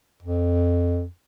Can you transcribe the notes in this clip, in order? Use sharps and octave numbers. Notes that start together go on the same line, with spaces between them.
F2